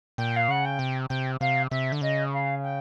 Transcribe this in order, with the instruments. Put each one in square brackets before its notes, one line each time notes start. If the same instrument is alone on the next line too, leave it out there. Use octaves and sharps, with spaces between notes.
[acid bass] A#2 [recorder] G5
[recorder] F5
[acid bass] C#3 [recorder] F#5
[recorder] G5
[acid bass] C3
[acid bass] C3 [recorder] G5
[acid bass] C3 [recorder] F5
[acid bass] C3 [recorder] E5
[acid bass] D3
[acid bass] C#3 [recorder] D#5
[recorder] F5
G5